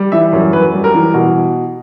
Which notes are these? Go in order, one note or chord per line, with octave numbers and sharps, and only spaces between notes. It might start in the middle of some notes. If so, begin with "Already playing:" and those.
Already playing: G3
E3 E5
F#2
F#2 B4
G3
A#4
E3
B2